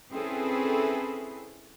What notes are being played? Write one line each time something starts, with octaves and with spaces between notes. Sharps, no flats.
C4 C#4 E4 G#4 A4 B4